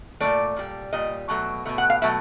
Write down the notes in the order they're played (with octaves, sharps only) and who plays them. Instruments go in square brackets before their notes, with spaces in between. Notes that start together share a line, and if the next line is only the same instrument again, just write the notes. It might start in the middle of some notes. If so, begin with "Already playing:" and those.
[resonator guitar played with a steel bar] A#2 F#3 A3 D5
A#2 G3
A#2 G3 D#5
B2 F#3 A3
B2 F#3 A3
F#5
F5
B2 F#3 A3 E5